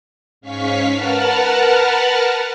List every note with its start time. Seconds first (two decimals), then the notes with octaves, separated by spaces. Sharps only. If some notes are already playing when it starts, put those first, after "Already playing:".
0.41 G#2 C#4 F5 C#6 B6
0.90 A#4 B4 F#5 A5 F6